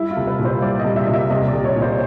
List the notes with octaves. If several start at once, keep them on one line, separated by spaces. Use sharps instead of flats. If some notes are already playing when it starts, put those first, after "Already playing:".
Already playing: G3 E4
F4
C2
B4
A#2
C5
G3 D5
D#5
C2
E5
A#2 D#5
E5
C2 D#5
D5
C2
C#5
A#2
C5